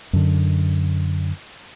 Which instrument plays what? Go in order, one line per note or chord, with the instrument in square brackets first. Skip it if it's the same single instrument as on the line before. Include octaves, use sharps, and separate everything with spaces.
[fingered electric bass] F#2 D3